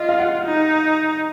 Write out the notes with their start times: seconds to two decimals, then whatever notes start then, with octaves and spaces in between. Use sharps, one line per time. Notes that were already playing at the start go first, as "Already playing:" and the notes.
Already playing: F4 D#5
0.09 F5
0.19 F#5
0.45 D#4